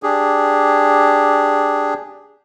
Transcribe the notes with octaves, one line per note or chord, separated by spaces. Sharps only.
D4 G4 G#4